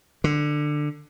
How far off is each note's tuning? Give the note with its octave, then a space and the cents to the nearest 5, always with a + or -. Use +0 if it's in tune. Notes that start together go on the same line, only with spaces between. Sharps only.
D3 +15